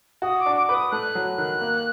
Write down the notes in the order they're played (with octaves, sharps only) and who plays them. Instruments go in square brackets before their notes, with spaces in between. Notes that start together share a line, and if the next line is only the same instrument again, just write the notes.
[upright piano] F#4 [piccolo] D#6
[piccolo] D6
[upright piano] D4
[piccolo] D6
[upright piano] B4 [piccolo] D6
[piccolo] D#6
[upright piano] A3 [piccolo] F#6
[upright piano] F#3
D#3
A#3